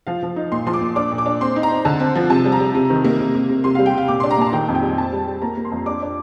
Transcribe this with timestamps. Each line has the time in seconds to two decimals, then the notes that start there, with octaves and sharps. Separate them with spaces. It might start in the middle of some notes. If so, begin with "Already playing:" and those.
0.07 F3 F5
0.23 F3
0.36 D#4
0.52 A#2 C6
0.66 F3 C6
0.74 D6
0.81 A#2
0.96 D4 D6
1.11 A#2
1.18 D6
1.26 D4
1.41 C4 C6
1.56 D#4
1.63 A#5
1.70 C4
1.85 D3 A5
2.00 C4
2.15 F3
2.30 C3 A5
2.45 G3
2.52 A#5
2.60 G3
2.75 C3
2.90 D#3
3.05 A#3
3.19 C3
3.34 C3
3.49 C3
3.64 C3 C6
3.75 G3 F5
3.86 G5
3.94 C3 F5
4.08 A#2 D6
4.20 D4 C6
4.31 A#5
4.38 A#2 A5
4.52 D#3 G5
4.68 F2
4.75 G5
4.82 G3
4.97 C4 A5
5.12 G3
5.27 G3
5.42 A#3 A#5
5.57 A#3
5.65 C6
5.72 F2
5.86 D4 D6
6.02 D4